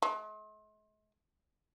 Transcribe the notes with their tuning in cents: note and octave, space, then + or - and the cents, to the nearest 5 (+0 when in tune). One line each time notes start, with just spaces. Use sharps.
G#3 +45